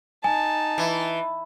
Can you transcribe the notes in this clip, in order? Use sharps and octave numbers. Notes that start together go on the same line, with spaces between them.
D#4 G#5 A5
E3